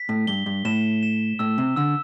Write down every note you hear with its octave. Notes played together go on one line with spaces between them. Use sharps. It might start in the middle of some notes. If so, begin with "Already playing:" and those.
Already playing: B6
A2
G2 G7
G2
A2 E7
E7
A2 E6
C3
D3 E6